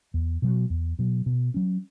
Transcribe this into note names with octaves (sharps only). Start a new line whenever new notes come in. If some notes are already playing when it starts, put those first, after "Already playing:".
E2
B2 F#3
E2
B2 F#3
B2
F#3 C#4